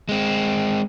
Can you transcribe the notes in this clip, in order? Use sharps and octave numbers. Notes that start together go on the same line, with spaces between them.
G#3 C4